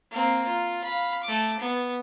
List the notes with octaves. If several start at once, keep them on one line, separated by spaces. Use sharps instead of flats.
A#3 C4
F4
F5 B5
A3 D6
B3